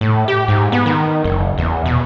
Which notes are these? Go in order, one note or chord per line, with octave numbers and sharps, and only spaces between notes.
A2
G4
G#2
B3
D#3
F#1
E2
B2